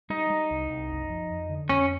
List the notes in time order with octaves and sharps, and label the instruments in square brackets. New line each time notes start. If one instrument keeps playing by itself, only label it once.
[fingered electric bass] G3 [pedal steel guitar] D#4
[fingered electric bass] G3
C2
C2
F#1
F3
F2
D3
[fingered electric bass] F2 [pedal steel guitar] C#4